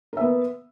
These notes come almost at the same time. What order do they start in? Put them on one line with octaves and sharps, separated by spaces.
A#4 E5 B3